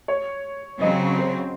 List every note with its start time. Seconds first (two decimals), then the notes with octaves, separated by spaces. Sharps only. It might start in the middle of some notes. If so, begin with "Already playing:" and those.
0.08 C#5
0.82 C#3 F#3 C4 D#5
1.19 C5